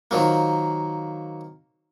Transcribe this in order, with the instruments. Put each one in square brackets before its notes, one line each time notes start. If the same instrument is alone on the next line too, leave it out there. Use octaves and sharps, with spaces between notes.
[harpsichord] D#3 F3 F#3 A#3